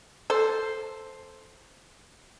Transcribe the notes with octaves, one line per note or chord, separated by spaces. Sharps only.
A4 C5